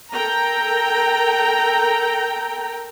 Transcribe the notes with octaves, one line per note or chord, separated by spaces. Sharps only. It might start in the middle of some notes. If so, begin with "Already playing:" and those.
A4 A#4 G5 A#5